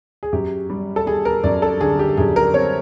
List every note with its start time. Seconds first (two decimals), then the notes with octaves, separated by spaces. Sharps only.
0.23 G#4
0.33 F#2 G4
0.70 G3
0.96 A4
1.07 G3 G#4
1.25 A#4
1.44 F#2 D5
1.62 A4
1.81 D3 G#4
1.99 G4
2.17 F#2 G#4
2.36 A#4
2.54 C4 C#5